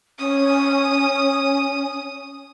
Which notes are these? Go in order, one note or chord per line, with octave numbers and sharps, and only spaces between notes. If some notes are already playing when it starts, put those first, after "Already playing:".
C#4 D#6